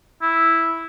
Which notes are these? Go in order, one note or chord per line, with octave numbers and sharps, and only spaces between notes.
E4